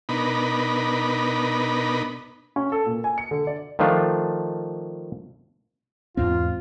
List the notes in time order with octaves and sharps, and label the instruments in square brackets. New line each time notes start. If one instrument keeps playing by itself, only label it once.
[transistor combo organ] B2 B3 D4 D#4 A#4 B5
[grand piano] C#4
A4
A#2
G#5
C#7
D3
D5
[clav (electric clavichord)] D#3 F3 A3 D4 F4
[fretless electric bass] E2 G#2 C4 [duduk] F4